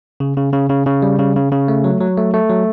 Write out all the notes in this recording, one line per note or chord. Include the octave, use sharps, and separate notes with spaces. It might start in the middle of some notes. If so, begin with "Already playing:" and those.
C#3
C#3
C#3
C#3
C#3
G3
C#3
C#3
C#3
A3
F#3
F#3
A3
A3
F#3